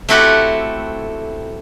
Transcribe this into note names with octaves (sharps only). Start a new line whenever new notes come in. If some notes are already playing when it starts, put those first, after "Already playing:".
A3 C4 E4 F#4 G4 A4